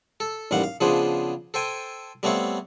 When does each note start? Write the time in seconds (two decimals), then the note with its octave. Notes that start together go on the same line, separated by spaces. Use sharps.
0.20 A4
0.51 A1 D#2 G3 F5 F#5
0.64 F5
0.81 C#3 F3 B3 D4 G#4 C5
1.54 A4 C5 G5 G#5
2.23 G3 A3 B3 C4 C#5 F5